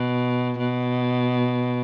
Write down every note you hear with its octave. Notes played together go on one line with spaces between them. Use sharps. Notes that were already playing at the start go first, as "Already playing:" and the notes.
Already playing: B2
B2